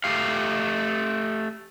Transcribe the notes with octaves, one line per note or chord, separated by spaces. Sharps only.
A3 G4 F5